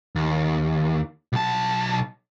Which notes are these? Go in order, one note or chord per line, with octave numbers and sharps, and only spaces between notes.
D#2
B1 A5